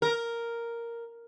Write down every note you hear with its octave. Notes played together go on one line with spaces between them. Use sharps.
A#4